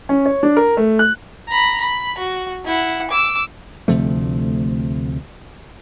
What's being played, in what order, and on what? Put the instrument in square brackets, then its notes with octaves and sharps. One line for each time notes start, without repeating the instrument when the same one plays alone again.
[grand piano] C#4
C#5
D4
A#4
A3
F#6
[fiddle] A#5 B5
B5
F#4
E4 F#5
D6 E6
[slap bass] D2 C3 F3 A3